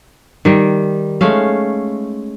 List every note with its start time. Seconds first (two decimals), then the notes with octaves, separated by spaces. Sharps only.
0.45 D#3 G3
1.21 G#3 A3 C#4 F5